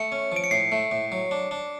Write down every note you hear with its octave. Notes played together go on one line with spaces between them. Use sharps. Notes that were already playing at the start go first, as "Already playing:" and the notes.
Already playing: A3 C#7
C#4
F3 D7
C#7
A2 C7
A3
A2
F#3
D4
D4